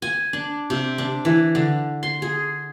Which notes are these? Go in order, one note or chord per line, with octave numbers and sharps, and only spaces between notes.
G#5
D4
C3
D4
E3
D3
C6
G#4